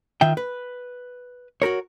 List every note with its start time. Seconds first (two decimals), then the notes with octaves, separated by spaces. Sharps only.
0.21 D#3 F4 E5 G5
0.37 B4
1.62 F#4 G4 A#4 C#5